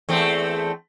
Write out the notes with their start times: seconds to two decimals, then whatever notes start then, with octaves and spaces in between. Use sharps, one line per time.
0.09 E2 A3 C4